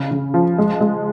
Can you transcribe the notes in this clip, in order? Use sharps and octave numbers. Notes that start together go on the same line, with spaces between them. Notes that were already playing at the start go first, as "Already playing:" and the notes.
Already playing: C#3
C#3
F3
G#3
G#3